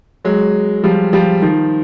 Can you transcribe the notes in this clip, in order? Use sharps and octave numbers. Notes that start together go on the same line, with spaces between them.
F#3 G#3
F3 G3
F3 G3
D#3 F3